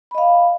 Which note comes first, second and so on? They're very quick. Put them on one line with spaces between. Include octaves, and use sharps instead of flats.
B5 D#5 F5